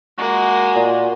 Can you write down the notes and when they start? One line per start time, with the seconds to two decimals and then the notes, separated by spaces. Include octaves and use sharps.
0.18 G#3 A#3 F#4
0.76 A#2